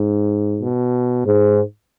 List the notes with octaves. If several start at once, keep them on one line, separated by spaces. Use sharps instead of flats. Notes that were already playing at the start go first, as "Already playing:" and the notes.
Already playing: G#2
B2
G#2